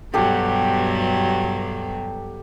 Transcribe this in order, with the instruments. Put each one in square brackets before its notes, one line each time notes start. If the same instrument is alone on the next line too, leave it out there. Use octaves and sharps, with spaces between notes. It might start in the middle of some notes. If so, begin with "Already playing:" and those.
[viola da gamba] G2 B2 F#3 [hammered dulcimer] G4 A4 F#5